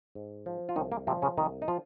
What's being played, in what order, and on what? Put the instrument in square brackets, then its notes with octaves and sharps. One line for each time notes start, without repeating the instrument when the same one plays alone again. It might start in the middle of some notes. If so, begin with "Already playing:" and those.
[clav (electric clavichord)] G#2
F3
F4
C2 D#3 D#4
A#3
C3 F3 C4
C#3 C#4
C2 D#3 D#4
D#4
F3 F4